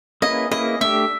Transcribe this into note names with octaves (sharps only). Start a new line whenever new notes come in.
A#3 C#4 E4 G#4 B4 D#5
A#3 C#4 E4 G#4 B4 D#5
A3 D4 G4 E5